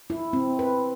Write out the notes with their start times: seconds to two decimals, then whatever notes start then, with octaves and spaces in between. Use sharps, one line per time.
0.10 E4
0.33 C4
0.59 B4